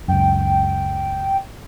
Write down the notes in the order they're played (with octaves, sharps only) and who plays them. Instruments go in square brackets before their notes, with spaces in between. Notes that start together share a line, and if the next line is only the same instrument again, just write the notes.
[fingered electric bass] C#2 F#2 [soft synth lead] G5